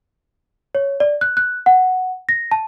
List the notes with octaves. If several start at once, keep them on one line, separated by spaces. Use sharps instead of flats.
C#5
D5
F#6
F#6
F#5
A#6
A5